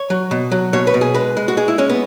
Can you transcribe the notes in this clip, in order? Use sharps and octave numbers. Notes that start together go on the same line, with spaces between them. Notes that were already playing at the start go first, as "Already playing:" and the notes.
Already playing: C#5
F#3
B2
F#3
B2 C#5
B4
B2
G#4
G#3 B4
G#3
F#4
G#3 G#4
E4
G#3 C#4
B3